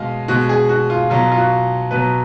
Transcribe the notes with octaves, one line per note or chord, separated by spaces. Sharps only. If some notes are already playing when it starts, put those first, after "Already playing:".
Already playing: B2 G#3 D#5 F5
B2 G#3 F#4
G#4
F#4
F4
B2 F#3 F4
F4
F#4
B2 F#3 B4